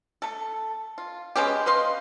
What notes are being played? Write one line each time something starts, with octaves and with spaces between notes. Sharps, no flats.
A3 A4
F4
G#3 B3 C#4 G4
B4 D#5 F5 C6